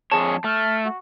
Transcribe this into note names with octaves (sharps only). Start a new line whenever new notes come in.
F2 G#4 C#5 A5
A3 F6
F#4